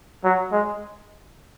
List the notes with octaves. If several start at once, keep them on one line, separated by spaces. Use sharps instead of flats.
F#3
G#3